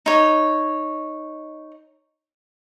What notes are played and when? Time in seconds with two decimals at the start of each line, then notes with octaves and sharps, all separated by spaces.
0.06 D#4 C#5